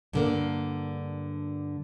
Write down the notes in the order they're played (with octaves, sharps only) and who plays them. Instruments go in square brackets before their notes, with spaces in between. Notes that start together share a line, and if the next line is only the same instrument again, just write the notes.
[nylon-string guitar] G2 D3 A#3